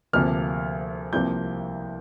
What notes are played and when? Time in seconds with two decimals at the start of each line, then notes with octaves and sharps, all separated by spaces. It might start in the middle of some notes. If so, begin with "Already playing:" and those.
0.13 D2 C3 F3 A#3 F6
1.13 C2 C3 F3 A#3 G6